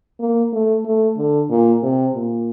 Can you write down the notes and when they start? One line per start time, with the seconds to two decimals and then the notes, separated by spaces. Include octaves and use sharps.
0.20 A#3
0.52 A3
0.85 A3
1.17 D3
1.50 A#2
1.83 C3
2.15 A#2